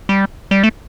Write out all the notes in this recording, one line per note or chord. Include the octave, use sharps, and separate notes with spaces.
G3
G3
A3